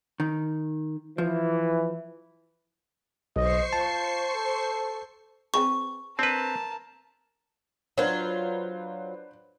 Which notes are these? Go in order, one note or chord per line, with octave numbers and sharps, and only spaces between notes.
D#3
E3 F3
B1 C5 D#5 C#6 C7
F4 A5
A4
C4 G#4 B4 C#6
C4 D4 A#4 B4 A5
F#3 D4 F4 B4 C5